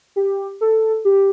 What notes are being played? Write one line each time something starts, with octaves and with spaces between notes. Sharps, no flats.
G4
A4
G4